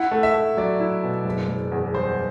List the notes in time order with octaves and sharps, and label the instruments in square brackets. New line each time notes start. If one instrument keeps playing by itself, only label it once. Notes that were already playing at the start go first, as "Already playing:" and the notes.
Already playing: [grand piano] E4 [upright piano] F#5
[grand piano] A3
[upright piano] E5
[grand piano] A3
[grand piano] F#3 [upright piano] D5
[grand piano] E4
B2
F#1
F#1
E2
[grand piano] G3 [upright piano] C5